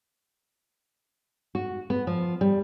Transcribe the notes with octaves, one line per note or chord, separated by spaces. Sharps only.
F#4
B3
F3
G3